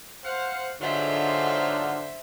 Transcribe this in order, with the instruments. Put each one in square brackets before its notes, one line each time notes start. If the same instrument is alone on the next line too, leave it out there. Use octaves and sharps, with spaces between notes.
[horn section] C5 F5 F#5
[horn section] G#2 F#3 F4 [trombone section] D3 [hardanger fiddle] C5 E5